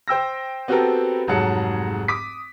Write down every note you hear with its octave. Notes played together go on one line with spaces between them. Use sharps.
C5 G5 E6 A#6
B3 C4 F#4 G4 A4 A#4
F1 G#2 F#3 G#4 F#5 A5
D6 D#6 B6